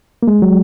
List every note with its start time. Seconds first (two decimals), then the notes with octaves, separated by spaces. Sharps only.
0.23 A#3
0.28 G#3
0.42 F#3